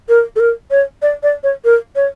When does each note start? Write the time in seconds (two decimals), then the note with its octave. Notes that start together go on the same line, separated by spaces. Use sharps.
0.09 A#4
0.36 A4
0.40 A#4
0.71 C#5
1.02 D5
1.23 D5
1.44 C#5
1.65 A#4
1.96 C#5